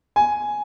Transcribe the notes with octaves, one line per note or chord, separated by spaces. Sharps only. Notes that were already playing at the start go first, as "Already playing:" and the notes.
G#5